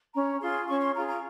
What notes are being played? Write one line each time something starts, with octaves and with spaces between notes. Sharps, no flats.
C#4 A#5
F4 G#4 C6
C#4 C#6
C6
F4 G#4 A#5
A#5